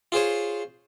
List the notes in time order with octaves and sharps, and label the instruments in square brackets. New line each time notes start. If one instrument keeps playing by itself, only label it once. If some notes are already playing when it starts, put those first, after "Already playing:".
[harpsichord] F4 G#4 C5 C#5